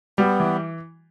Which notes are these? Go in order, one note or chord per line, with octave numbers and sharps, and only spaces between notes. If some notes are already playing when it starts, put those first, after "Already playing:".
G3 B3
E3